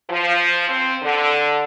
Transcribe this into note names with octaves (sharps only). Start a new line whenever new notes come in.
F3
C4
D3